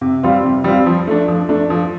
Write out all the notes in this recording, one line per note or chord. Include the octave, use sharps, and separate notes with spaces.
C3
G3 C4 F4
C3
G3 C4 F4
F3
A3 D4
F3
A3 D4
F3